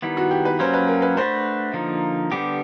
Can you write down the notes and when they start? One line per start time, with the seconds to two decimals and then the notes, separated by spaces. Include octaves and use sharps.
0.02 D#3 G3 B3 E4
0.17 F#4
0.31 G4
0.45 B4
0.59 F#3 A#3 C#4 C5
0.74 B4
0.88 A#4
1.02 B4
1.17 A3 D4 F#4 B4 C5
1.74 D3 F3 A#3 D#4
2.32 D3 G3 B3 D4 G4